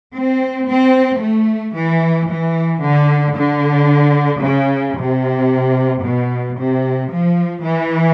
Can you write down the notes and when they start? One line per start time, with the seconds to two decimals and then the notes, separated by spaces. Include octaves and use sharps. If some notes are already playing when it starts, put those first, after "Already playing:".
0.13 C4
0.67 C4
1.20 A3
1.74 E3
2.28 E3
2.82 D3
3.35 D3
4.42 C#3
4.96 C3
6.03 B2
6.57 C3
7.11 F3
7.64 E3